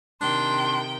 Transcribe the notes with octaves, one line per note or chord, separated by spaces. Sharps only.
C3 D#3 D4 G5 C6